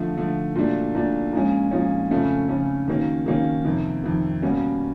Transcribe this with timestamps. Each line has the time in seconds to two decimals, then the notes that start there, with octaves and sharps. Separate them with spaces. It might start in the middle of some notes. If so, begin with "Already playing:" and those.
Already playing: D3 F3 A3
0.17 D3 F3 A3
0.56 A#2 F#3 A3 D4
0.95 A#2 F#3 A3 D4
1.33 A#2 F3 G#3 C#4
1.71 A#2 F3 G#3 C#4
2.11 F2 C#3 F3 A3 C#4
2.49 F2 C#3 F3 A3 C#4
2.88 D#3 F#3 A#3 C#4
3.26 D#3 F#3 A#3 C#4
3.65 F2 C3 D#3
4.04 F2 C3 D#3
4.42 B2 G3 A#3 C#4 F#4